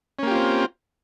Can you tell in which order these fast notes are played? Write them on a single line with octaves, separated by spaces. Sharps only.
C#4 A#3 G4 F4 C4